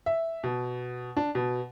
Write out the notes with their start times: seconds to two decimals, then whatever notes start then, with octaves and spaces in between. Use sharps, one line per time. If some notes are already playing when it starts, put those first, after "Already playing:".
0.06 E5
0.44 B2
1.17 D4
1.35 B2